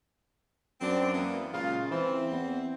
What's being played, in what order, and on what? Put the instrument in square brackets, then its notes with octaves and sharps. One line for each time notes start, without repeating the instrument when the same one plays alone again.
[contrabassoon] F#2 [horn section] C4 D4
[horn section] E3 A#3 B3
[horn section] A#2 G#3 F4 [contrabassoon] C#3
[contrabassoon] E3 [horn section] C4
[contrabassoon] E2